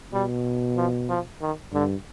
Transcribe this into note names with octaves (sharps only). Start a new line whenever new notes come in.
B2 G3
F3
F3
D#3
G2 D3